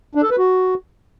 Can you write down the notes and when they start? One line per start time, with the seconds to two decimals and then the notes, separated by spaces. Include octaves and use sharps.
0.15 D4
0.23 A4
0.30 B4
0.38 F#4